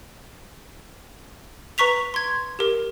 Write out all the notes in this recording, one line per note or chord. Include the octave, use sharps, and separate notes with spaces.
B4 A#5 C#6 B6 F7
C6 G#6
G4 A#4